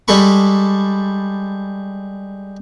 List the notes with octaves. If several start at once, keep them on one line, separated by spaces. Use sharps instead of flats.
G3 G#3 A4 B5 C#6